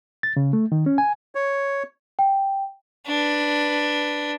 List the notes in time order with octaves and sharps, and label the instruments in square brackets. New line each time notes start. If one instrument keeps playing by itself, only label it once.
[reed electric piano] A6
C#3
A3
D#3
C#4
G#5
[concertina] C#5
[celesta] G5
[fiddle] D4 B4